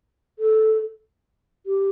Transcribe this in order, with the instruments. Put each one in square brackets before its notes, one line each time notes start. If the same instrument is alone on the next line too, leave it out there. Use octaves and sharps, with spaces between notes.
[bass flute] A4
G4